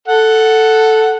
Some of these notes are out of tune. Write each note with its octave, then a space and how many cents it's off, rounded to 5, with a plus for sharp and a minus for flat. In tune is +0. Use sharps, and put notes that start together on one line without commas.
A4 +0 F#5 +0